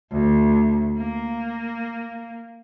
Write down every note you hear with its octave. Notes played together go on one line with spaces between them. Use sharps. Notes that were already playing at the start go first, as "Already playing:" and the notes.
D2
A#3